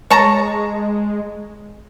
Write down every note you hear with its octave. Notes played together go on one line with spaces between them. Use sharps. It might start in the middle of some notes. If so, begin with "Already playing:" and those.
G#3 C#5 A5 A#5